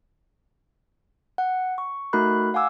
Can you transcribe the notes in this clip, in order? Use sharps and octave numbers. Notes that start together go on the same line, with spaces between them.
F#5
C#6
A3 D#4 F#4 A#4 B5 F#6
F5 F#5 G#5 D6 E6